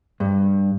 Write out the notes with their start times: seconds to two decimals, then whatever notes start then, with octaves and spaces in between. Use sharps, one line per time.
0.20 G2